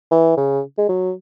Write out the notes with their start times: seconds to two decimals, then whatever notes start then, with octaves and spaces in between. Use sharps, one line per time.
0.11 E3
0.37 C#3
0.78 G#3
0.89 F#3